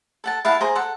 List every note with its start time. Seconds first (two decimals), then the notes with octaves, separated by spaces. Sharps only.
0.24 A4 F#5 A5
0.45 E4 F5 F#5 A5
0.60 G#4 C5 A#5
0.75 A4 F#5